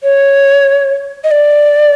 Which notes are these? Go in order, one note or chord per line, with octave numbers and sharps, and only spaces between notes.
C#5
D#5
D5